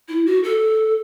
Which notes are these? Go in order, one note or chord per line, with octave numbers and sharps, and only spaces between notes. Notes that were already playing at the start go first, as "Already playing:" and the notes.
E4
F#4
A4